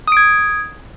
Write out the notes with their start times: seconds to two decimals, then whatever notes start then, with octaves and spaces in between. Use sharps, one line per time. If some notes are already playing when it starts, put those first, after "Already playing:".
0.08 D#6
0.12 D7
0.17 G#6